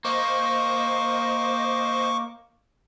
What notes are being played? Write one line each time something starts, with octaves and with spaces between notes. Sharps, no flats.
A#3 C5 D#5 C#6 D6